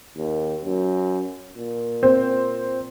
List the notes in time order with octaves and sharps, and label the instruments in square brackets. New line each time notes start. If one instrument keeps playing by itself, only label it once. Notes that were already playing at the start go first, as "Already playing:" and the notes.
[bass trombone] D#2
F#2
A#2
[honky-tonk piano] C4